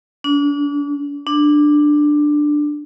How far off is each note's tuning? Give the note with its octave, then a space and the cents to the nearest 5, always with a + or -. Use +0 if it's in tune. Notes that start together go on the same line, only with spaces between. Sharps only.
D4 -35
D4 +10